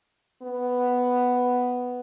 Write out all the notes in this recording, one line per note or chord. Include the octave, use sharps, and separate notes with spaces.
B3